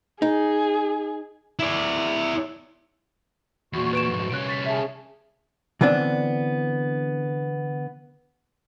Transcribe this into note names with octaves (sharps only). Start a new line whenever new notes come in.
D#4 G#4
E4 D5
E2 A#2 F#4 C#6
B4 D7 E7
F2 G#2
C2 C#4 F#6 D7
C#6 A6 B6
G#4 E5 A5
D3 E3 B3 C4 D4